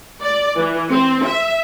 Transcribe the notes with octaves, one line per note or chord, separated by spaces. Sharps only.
D5
E3
C4
E5